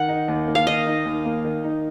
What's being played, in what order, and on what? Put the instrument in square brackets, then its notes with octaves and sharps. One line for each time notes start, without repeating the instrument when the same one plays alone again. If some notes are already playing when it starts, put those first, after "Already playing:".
Already playing: [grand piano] D#3 [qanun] F#5
[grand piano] D#4
D#2
A#3
[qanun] F5
[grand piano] D#3 [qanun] D#5
[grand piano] D#4
D#2
A#3
D#3
D#4